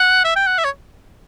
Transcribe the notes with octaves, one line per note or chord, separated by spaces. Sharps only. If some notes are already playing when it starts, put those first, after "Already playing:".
Already playing: F#5
E5
G5
F#5
E5
C#5